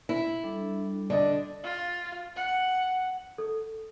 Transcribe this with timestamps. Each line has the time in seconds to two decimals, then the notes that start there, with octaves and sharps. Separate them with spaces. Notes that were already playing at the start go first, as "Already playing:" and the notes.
0.09 E4
0.43 G3 D4 A4
1.10 D3 D5 D#5
1.63 F4
2.36 F#5
3.38 A4